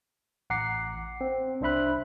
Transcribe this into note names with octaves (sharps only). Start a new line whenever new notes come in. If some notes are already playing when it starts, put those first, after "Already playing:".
A1 F#5 A#5 D6 C7
C4
C2 D4 C5 E5 B5 F#6